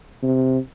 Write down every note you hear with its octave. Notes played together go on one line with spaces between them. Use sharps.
C3